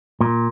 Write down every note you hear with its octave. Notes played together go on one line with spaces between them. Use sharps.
A#2